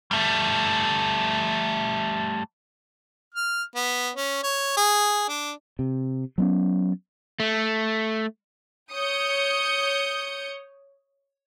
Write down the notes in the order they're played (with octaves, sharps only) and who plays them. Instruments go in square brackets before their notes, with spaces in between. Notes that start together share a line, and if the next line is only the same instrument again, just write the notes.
[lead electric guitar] G3 A3
[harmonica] F6
B3
C#4
C#5
G#4
D4
[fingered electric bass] C3
F#3 B3 C#4
[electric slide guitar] A3
[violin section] C#5 D#6 G6 C#7